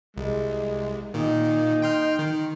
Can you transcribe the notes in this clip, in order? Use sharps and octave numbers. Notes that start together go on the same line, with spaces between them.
C2 G#3
A#2 D#3 D#4
G5 C6 F6
D#3